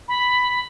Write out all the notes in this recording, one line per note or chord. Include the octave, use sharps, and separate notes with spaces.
B5